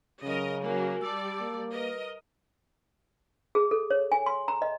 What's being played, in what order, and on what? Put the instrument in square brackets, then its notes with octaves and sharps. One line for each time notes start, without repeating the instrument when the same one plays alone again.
[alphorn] C#3 [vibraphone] F#3 C#4 [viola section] A#4 D#5
[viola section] F#3 A#3 [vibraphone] F#4 A#4 G#5
[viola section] G3 D5 [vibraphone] A5 D6 E6
[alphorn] A#3
[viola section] A#4 D#5 [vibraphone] B4
[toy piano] G#4
A4
C#5
G#5
C6
A#5
D#5